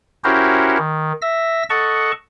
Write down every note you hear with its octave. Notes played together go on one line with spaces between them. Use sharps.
C#4 E4 F#4 G4 A#4 C5
D#3
E5 E6 A#6
A4 D#5 F#5 A5 C#6